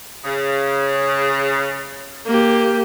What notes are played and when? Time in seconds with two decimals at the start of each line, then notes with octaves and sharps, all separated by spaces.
0.23 C#3
2.26 A#3 G4